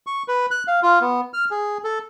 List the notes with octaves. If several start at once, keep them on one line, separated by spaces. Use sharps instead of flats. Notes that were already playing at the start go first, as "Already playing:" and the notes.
C#6
B4
F#6
F5
F4
B3
F6
G#4
A4